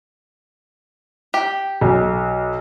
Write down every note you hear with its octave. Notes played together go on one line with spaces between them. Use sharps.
G4
B1